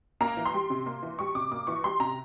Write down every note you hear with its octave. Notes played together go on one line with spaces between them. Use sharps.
A#3 A#5
E3
C6
G3
C3
A#3
E3
G3 C#6
C3 D6
A#3 D6
E3 C#6
G3 C6
C3 A#5